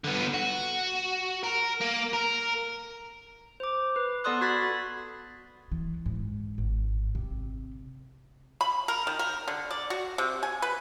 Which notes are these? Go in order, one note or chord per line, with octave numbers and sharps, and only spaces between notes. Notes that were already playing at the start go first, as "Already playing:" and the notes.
D3 B3
F#4
A#4
A#3
A#4
C5 D6
B4
B3 A4 D5 C6 D#6 F#6
F#4 B5 G#6 A6 B6
E3
G#2
G#1
C3
B5
A#4
D#3
A#4
D3
D5
F#4
C3
G#5
B4